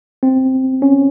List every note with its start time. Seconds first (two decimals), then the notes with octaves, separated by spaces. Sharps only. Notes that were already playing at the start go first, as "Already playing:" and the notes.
0.23 C4
0.82 C#4